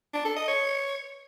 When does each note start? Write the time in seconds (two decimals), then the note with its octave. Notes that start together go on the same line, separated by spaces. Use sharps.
0.14 D4
0.25 A4
0.36 D#5
0.48 C#5